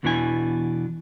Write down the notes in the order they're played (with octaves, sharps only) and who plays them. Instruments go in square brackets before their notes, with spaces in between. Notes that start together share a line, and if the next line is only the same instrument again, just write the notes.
[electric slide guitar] E2 B2 E3 D4 E4 G#5